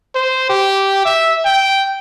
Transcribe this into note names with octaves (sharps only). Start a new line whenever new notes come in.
C5
G4
E5
G5